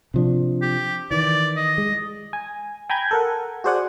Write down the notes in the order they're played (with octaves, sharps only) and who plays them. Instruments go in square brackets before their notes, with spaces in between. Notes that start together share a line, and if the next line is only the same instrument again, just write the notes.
[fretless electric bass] C3 F3 D4
[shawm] G4
[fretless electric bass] D#3 E3 [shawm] D5
[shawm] D#5
[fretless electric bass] G#3
[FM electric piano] G#5
G5 G#5 A#5 B5 G6 G#6
A4 A#4 F#5
F#4 G#4 C5 D5 F#5 G#5